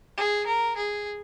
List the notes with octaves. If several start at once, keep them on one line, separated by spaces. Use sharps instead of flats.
G#4
A#4
G#4